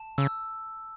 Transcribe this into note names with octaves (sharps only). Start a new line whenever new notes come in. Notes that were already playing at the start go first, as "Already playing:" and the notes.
Already playing: A5
C#3 E6